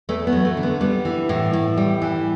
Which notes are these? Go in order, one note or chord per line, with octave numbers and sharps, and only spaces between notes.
E2 A3
B3
F#3
A3
D3
B3
G3 B3
E3
A2
A2
G3
E3